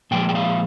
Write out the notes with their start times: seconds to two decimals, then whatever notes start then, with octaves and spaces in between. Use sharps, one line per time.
0.11 A#2 F3 G#3 G5
0.29 G5
0.35 F5